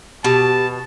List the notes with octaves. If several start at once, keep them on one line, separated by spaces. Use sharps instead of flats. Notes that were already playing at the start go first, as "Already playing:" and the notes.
B2 G4 A5